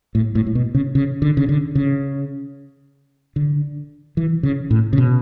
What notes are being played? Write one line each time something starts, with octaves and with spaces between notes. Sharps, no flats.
A2
A2
A2
B2
C#3
C#3
D3
C#3
D3
C#3
D3
E3
C#3
A2
C#3
B2